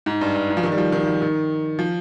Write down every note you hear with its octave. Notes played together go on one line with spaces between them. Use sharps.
G#2
G2
G2
G#2
F3
D#3
G3
F3
D#3
F3
D#3
F3